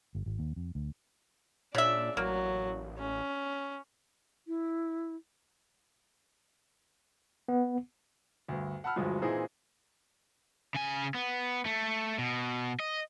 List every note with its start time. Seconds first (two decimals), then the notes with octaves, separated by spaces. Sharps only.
0.15 G1
0.26 G#1
0.39 D#2
0.56 F2
0.75 D2
1.75 A#2 C#3 D4 E5
2.17 A1 F#3 A#3
2.99 C#4
4.47 E4
7.48 B3
8.48 D2 G2
8.84 F#5 A5 B5 E6 F6
8.96 D2 G2 F3 F#3 G#3
9.22 A#2 E3 C4 D#4 E4 G#4
10.74 C#3 G#5
11.14 B3
11.65 A3
12.18 B2
12.80 D#5